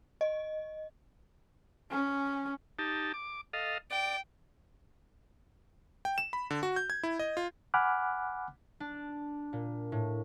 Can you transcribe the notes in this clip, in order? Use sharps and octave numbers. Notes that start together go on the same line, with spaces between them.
D#5
C#4
D#4 G4 A5
D6
A4 D#5 F5
D5 G5
G5
E7
B5
D3
F#4
G6
G#6
E4
D#5
F4
F#5 G#5 B5 D6 F6 F#6
D4
A#2
A2